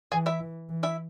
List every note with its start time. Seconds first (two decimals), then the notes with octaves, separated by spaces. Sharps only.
0.12 E3 G#4 G#5
0.26 E4 E5
0.40 E3
0.69 E3
0.83 E4 E5